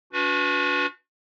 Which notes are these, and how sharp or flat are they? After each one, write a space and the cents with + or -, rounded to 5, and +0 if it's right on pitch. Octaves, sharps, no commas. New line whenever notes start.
D4 -40 F#4 -35 B4 +0